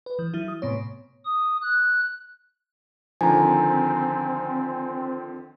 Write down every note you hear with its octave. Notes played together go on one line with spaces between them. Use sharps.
B4
E3
F#3 E4
D#6
A2 C3 B3 C#5
D#6
F#6
D3 D#3 F3 C4 G#5 A#5